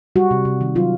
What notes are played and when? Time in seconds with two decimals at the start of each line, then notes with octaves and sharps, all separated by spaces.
0.16 G3 F#4
0.31 C3
0.45 C3
0.61 D#3
0.75 F#3 F4